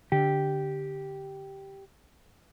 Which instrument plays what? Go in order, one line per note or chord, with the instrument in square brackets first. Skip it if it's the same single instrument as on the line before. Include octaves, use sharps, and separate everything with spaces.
[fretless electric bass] D3 [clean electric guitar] G4